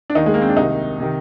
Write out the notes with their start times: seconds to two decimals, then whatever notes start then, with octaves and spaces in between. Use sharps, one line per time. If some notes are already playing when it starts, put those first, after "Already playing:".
0.10 D4
0.15 D#2 D#3 D#4
0.26 G#3
0.34 A#3
0.41 C4
0.49 D4
0.57 C2 C3 D#3 D#4
1.00 C3 D#3